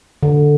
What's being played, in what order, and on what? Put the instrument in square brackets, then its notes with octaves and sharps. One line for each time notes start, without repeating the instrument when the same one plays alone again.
[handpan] D3